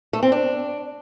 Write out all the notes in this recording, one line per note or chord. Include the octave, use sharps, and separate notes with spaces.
A3
C4
D4